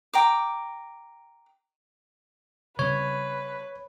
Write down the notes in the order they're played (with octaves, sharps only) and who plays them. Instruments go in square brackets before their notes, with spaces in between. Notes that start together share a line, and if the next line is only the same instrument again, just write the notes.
[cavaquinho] G5 A#5 D6
[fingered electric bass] C#3 G3 C4 [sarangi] B4 [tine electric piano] C#5